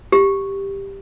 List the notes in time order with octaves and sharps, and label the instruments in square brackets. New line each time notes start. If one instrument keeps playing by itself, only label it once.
[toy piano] G4